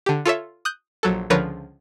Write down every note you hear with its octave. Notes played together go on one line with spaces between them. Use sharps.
D3 G4
F4 A4 C#5 E5
D#6 F#6 G6
A#1 F#3 A4
C#2 D3 F3 A#4 B4 C#5